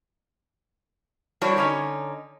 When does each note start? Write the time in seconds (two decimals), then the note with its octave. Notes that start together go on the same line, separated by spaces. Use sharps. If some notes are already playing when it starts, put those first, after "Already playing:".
1.41 G3 D4 E4 F#4 C5 C#5
1.57 D3 C#4 D#4 C#5